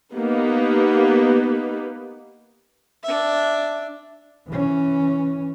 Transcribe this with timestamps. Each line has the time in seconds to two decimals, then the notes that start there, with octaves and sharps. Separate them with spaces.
0.14 A#3 B3 D#4 G4 B4
3.03 D4 E5
4.48 E3 C#4